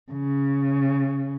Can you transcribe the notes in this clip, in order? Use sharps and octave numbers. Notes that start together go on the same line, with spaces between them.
C#3